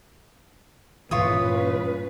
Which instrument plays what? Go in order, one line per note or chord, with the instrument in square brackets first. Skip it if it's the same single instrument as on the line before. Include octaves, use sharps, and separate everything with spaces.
[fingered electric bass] G2 A#2 E3 [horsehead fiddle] C#4 B4 [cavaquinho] F4 C#5 D#6